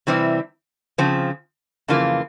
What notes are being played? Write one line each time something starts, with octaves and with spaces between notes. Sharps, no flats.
C3 E3 G3 C4 E4
C#3 F3 C4
F2 C#3 E3 A#3 F4